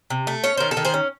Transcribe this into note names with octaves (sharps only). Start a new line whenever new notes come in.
C3
A3
C#4 C#5
D#3 C5
A4
D#3
G#4 C5
C#4